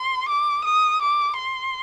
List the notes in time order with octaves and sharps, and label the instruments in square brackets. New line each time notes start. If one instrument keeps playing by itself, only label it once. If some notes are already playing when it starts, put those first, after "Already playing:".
Already playing: [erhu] C6
D6
D#6
D6
C6